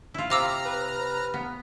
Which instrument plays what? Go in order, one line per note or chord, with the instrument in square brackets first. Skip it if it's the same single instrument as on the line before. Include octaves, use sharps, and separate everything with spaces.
[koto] E4 F4
[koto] C3 [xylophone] F5 D6 E6 [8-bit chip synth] A#5 F6
[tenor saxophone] B4
[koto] B3